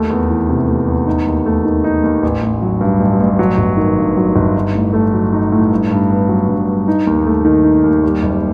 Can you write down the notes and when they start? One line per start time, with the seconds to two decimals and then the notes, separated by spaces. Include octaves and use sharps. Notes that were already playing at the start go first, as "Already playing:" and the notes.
Already playing: D#2 A3
0.10 E2
0.30 E3
0.49 C3
0.68 A3
0.88 E2
1.07 D#4
1.27 D#2
1.46 A3
1.65 D#3
1.84 D#4
2.04 D#2
2.23 A1
2.43 A1
2.62 F#3
2.81 G2
3.00 A1
3.20 A1
3.39 F#3
3.58 G1
3.77 D#3
3.97 G2
4.17 F#3
4.36 G1
4.56 D#4
4.75 A2
4.93 A3
5.14 F#3
5.33 D#4
5.52 A2
5.72 G2
5.91 G2
6.10 B3
6.29 F#3
6.49 G2
6.68 G2
6.88 D#4
7.07 D#2
7.26 A3
7.45 D#3
7.64 D#4
7.84 D#2
8.04 G3
8.23 F#1